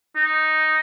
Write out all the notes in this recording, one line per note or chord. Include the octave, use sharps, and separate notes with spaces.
D#4